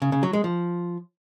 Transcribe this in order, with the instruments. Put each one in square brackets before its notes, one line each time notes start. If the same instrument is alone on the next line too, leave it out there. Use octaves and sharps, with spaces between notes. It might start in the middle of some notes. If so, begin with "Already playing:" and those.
[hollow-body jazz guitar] C#3
C#3
F#3
G#3
F3